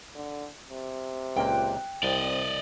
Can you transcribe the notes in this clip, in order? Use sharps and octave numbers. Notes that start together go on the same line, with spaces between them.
D3
C3
C#2 A#2 A#3 G5 F#6
C2 C4 D5 D#5